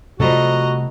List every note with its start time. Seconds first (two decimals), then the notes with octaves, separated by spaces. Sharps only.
0.20 C3 F3 G3 A3 F#4 A4 D#5 A#5